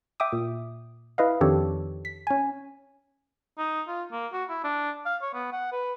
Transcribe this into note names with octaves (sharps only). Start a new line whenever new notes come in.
E5 G5 D6 D#6
A#2
E4 B4 D#5 F5
F2 D#3 D4 G4 A4 C#5
B6
C#4 G#5
D#4
F4
A#3
F#4
E4
D4
F5
C#5
B3
F#5
B4